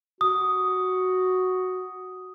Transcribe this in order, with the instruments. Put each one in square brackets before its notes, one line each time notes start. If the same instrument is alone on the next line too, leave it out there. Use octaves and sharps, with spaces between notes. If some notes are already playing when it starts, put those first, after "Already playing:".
[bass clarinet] F#4 [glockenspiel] D#6